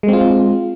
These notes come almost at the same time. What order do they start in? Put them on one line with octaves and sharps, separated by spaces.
G#3 C4 F4